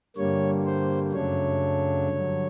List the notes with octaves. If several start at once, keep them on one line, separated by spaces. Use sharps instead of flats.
G2 D3 G3 A#3 C#5
C5
F#2 C#3 F#3 A3 D4 C#5
G2 D3 F#3